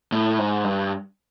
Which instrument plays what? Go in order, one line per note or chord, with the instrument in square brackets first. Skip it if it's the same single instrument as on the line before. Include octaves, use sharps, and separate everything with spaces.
[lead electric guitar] A2
G#2
G2